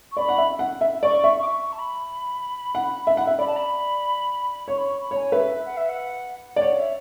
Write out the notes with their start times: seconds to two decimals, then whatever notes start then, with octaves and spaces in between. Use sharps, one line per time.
0.11 C#6
0.17 D5 B5
0.29 F#5
0.38 E5
0.59 F#5
0.81 E5
1.03 D5 C#6
1.24 E5 C#6
1.41 D6
1.46 C#6
1.72 A5
1.78 B5
2.75 F#5
3.07 E5
3.17 F#5
3.27 E5
3.39 D5 B5
3.47 A5
3.56 B5
4.68 C#5 C#6
4.77 B5
4.85 C#6
5.00 B5
5.11 C#5
5.16 G#5
5.32 B4 E5
5.65 F#5
5.77 E5
5.89 F#5
6.56 D5
6.61 C#5 F#5
6.78 E5